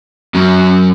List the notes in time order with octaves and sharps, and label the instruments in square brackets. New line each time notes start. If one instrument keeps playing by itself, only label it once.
[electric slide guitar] F#2 F#3